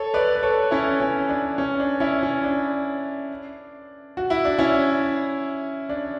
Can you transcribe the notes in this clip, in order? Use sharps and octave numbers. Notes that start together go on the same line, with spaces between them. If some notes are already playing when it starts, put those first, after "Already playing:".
Already playing: A4 C#5
B4 D5
B4
A4 C#5
C#4 E4
C#4
D4
C#4
D4
C#4 E4
C#4
D4
F#4
E4
D4
C#4 E4
D4